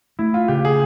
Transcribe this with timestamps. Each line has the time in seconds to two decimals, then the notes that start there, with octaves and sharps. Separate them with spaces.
0.19 A3 E4
0.34 F4
0.48 C#3 G4
0.65 G#4